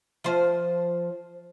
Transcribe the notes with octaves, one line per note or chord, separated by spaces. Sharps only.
F3 C5